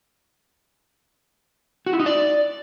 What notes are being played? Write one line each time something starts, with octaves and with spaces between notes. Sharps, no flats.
F#4
E4
D#4
D5